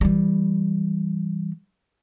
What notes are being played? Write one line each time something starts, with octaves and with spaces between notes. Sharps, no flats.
E3 G3